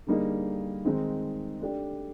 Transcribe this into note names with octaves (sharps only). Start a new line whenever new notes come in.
D3 G3 A#3 D#4 G#4
D#3 G#3 C4 D#4
A3 D4 G4